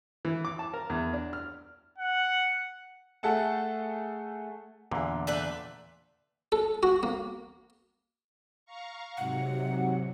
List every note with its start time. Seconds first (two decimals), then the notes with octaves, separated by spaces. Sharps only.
0.25 E3
0.45 D6
0.59 A5
0.74 A#4
0.90 E2
1.13 D4
1.33 F6
1.98 F#5
3.23 A3 G#4 A4 F#5 A5
4.91 E2 A#2 D3
5.27 A3 D4 B4
6.52 A4
6.83 F#4
7.03 A#3
8.66 F5 A#5 C#6
9.17 G#2 C3 F#3 F#5